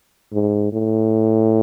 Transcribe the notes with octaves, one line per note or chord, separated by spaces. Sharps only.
G#2
A2